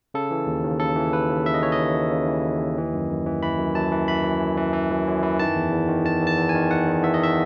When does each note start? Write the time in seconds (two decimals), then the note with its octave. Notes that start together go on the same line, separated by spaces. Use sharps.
0.14 C#3 A4
0.31 E3
0.47 D#2
0.64 D#2
0.80 C#3 A4
0.96 E3
1.13 D#2 B4
1.29 D#2
1.46 C#3 E5
1.54 D#5
1.62 E3 C#5
1.72 D#5
1.79 D#2
1.95 D#2
2.12 C#3
2.28 E3
2.44 D#2
2.61 D#2
2.78 E3
2.93 F#2
3.10 F#2
3.26 E3
3.43 E3 B5
3.59 F#2
3.75 F#2 A5
3.92 E3
4.08 E3 B5
4.25 F#2
4.41 F#2
4.57 E3
4.73 E3
4.91 F#2
5.07 F#2
5.23 E3
5.39 D#3 A5
5.56 E2
5.72 E2
5.88 D#3
6.05 D#3 A5
6.22 E2
6.27 A5
6.38 E2
6.49 G#5
6.55 D#3
6.71 D#3 F#5
6.87 E2
7.04 E2 E5
7.14 D#5
7.20 D#3 E5